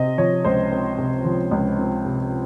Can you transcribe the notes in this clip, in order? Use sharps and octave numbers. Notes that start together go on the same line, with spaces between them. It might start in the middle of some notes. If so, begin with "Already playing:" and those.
Already playing: C3 C4 D#5
F3 C#5
C#2 C5
C4
C3
F3
C#2
C4
C3